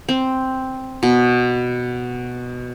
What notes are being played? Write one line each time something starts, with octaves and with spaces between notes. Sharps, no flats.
C4
B2